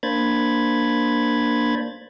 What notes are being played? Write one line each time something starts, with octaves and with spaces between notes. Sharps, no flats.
A#3 D4 C5 B5 G#6 A6